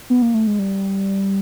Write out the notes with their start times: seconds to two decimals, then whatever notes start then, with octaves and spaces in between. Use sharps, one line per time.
0.10 B3
0.22 A#3
0.34 A3
0.47 G#3
0.59 G3